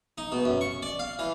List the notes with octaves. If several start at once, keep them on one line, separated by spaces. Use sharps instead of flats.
D#4
B2
F#2
C#6
D5
F5
E3